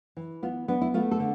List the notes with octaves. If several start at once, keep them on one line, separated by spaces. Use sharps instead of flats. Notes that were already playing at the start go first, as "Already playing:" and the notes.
E3
B3 F4
B3 D4
E4
A3 F4
A4
D3